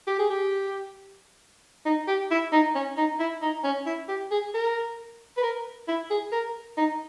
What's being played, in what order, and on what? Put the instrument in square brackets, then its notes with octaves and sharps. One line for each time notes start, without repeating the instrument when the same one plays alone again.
[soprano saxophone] G4
G#4
G4
D#4
G4
E4
D#4
C#4
D#4
E4
D#4
C#4
E4
G4
G#4
A#4
B4
A#4
E4
G#4
A#4
D#4